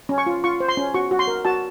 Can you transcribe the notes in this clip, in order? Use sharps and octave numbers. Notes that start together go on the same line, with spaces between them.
C#4
C#6
F4
F4 C#6
C5
C6
C#4
F#4 C#6
F#4
C6
A#4
F#4 A5